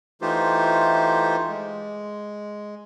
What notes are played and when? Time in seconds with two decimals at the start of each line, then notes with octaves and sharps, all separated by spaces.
0.22 E3 A3 D#4 F4 G4 C5
1.47 G#3